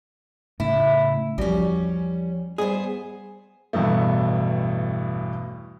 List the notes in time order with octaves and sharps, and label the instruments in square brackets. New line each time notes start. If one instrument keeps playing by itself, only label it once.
[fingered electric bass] A2 C#3 [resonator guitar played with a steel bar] E4
[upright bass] E2 F3 [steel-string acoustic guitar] G3 C#4 [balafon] F#4 D5
[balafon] G3 D5 [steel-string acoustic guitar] B3 C5 [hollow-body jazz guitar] G#4
[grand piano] A1 E2 G2 B2 A3